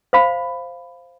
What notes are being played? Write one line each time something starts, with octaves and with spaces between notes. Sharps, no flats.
C5 F5 B5